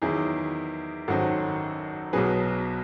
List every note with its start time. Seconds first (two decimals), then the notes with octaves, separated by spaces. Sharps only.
0.02 E2 D#3 F#3 E4 G#4
1.08 G#1 F#2 D#3 F#3 F#4 A4
2.13 B1 B2 F#3 G#4 B4